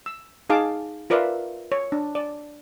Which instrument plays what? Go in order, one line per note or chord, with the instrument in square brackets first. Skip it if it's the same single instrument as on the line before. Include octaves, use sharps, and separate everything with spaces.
[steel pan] E6
D#4 G#4 F5 A5 D6
F4 A#4 B4 D5 E5 F5
C#5
D4
D5